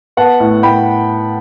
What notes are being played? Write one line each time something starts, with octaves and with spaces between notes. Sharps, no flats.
B3 F#5 A5
A2
A2 G5 B5